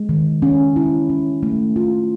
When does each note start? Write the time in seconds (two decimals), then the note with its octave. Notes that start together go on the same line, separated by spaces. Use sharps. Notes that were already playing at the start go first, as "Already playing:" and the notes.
Already playing: G#3
0.09 D#3
0.42 C#4
0.76 E4
1.10 C#4
1.43 A3
1.76 F4